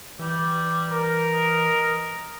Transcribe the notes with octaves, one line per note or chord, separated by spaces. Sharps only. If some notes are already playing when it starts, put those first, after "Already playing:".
E3 G3
A#4
D#5